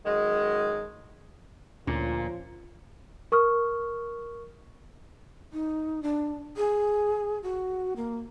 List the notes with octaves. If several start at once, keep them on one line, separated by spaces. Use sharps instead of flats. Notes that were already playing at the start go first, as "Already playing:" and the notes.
F#2 D#3 G#3
D2 A#2 F3 C#4 F4
A#4 C#6 D#6 F6
D#4
D4
G#4
F#4
A#3